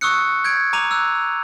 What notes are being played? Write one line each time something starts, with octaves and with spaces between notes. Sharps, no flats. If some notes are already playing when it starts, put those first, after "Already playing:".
C#6 D#6 E6 F#6 C#7
G6 G#6 D7
A#5 D6 D#7 F7
E6 F#6